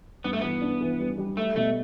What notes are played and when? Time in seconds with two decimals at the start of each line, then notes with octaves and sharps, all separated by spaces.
0.24 G2 B3
0.33 A3
0.41 E3 B3
0.61 D4
0.81 E3
1.00 G3
1.18 G3
1.37 A3 A4
1.56 B2 A3